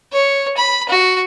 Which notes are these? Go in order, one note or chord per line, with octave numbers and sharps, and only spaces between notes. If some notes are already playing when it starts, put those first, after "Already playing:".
C#5
B5
F#4